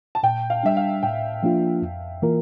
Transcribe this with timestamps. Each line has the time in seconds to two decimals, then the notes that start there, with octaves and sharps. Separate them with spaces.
0.15 A5
0.23 A#2 G5
0.50 F5
0.63 G3 D4 E5
0.77 F5
1.03 A2 G5
1.43 F3 A#3 D4 F4
1.82 F2
2.22 E3 A#3 F4 A#4